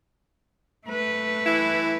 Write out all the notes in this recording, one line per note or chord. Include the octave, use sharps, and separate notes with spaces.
A3 B4
E3 E4